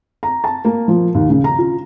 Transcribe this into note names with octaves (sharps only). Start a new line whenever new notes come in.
A#5
A5
A#3
F3
D#2
C#3
A#5
F4